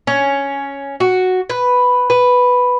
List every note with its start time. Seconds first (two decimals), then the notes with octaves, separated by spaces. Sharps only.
0.07 C#4
1.00 F#4
1.50 B4
2.10 B4